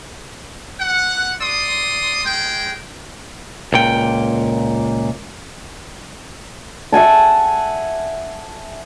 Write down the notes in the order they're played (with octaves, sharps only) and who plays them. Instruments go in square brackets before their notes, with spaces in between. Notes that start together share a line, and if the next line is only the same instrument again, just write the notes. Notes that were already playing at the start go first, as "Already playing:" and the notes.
[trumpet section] F#5
D5 C6 D#6
G#3 G5
[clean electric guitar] C#2 A#2 G5
[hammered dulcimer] E5 F#5 G#5 A5